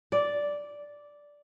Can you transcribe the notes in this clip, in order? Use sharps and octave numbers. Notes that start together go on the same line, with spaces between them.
D5